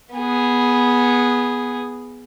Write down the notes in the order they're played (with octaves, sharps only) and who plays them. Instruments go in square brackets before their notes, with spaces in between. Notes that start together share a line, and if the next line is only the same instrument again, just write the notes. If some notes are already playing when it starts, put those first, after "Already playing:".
[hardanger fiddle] B3 G#4